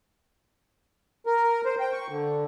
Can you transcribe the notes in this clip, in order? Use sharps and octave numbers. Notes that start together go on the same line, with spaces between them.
A#4
C5
G5
C#6
D3